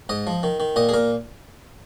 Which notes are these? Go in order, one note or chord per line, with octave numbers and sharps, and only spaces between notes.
G#2 D#5
F3
D#3
D#3
A#2 D#5
G#4
A#2 A#4